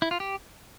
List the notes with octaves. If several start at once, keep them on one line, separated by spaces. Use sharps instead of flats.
E4
F4
G4